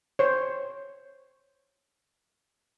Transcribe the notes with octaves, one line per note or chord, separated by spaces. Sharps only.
C5 C#5